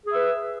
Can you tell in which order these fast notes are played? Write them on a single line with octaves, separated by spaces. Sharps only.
G#4 E5 B4